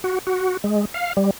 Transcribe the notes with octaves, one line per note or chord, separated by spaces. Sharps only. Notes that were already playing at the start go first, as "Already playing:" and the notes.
F#4
F#4
G#3
F5
G3